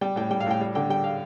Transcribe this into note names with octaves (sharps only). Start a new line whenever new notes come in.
G3 G5
A2 G5
G3 G5
F5
A2 G5
G3
D3 G5
G3 G5
F5